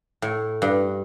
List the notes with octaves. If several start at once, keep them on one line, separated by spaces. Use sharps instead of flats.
A2
G2